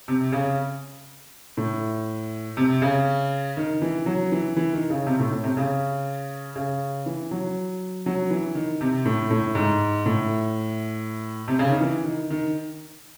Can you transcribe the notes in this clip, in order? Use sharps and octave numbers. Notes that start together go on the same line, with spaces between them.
C3
C#3
A2
C3
C#3
D#3
E3
F#3
E3
E3
D#3
C#3
C3
A2
A2
C3
C#3
C#3
E3
F#3
F#3
E3
D#3
C3
A2
A2
G#2
A2
C3
C#3
D#3
E3
D#3
D#3